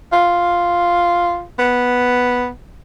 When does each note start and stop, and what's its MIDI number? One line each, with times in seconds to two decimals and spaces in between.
0.13 1.44 65
1.59 2.49 59